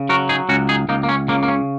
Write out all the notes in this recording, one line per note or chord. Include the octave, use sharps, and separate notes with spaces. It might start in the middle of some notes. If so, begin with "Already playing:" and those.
Already playing: C#3
F#3 F#4 A#4
D#4 G#4
C#2 C#4 F#4
D#4 G#4
C#2 A#3 D#4
A#3
C#4
C#3 A#3
A#3
C#4